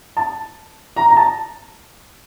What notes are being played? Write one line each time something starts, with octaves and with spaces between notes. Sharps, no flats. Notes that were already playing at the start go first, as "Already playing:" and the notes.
A5
A#5
A#5
A5